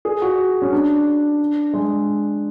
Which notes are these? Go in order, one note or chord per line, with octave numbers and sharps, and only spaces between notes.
G#4
F#4
C#4
D4
G#3